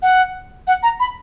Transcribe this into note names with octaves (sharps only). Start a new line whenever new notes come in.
F#5
F#5
A#5
B5